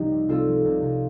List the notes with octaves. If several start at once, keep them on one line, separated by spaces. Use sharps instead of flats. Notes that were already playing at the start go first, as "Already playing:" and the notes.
Already playing: C2 F3 D#4 G4
C3
C2 F4 A4
F3
C2
C2